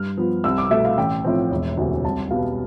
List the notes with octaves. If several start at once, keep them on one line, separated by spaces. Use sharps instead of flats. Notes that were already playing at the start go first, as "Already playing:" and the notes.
Already playing: G2 F6
F3 B3
C2 E6
D6
B2 A3 E5
F5
A1 G5
A2 F3 C4
E1
D2 C3 E3
C2 A5
B2 G3 B3 F5